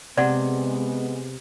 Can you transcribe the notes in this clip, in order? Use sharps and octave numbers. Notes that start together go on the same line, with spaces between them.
C3 G#3 B3 D5 F#5